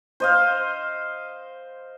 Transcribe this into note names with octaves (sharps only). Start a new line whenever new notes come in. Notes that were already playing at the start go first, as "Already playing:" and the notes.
C5 D#5 F5